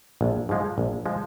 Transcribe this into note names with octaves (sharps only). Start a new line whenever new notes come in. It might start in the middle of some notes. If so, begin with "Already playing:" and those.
A#1
G#2 F3 G#3
A#1
F3 G#3